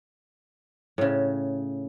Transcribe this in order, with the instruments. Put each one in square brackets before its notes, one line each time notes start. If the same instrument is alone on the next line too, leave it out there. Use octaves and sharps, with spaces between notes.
[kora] A2 C#3